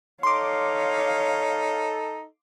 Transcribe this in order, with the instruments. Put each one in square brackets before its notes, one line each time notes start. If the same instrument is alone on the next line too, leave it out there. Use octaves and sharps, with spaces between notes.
[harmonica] D#4 [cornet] A4 [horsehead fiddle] C#5 F5 [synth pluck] C6 D6